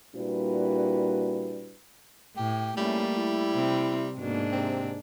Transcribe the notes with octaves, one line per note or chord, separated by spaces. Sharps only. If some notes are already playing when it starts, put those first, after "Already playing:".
A#2 G3 D4 E4 F#4 B4
A2 G4
G#2 G3 A3 A#3 C#4 E4
E4
C3 C4
B1 G#2 B2 A#3 D4
C3 C4